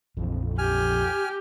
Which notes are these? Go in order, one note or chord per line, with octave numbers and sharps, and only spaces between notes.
A#1 F2 A#2 E3
G4 G#5 F6